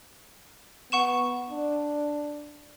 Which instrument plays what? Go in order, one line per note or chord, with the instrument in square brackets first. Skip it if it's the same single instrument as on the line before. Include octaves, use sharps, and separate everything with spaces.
[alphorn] B3 [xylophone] F#5 C#6 E7
[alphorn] D4